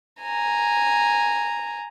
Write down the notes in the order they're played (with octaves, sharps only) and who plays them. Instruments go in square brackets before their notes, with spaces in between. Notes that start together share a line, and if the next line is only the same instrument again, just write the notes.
[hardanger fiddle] G#5 A#5